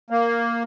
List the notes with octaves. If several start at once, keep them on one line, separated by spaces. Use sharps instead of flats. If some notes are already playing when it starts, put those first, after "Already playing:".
A#3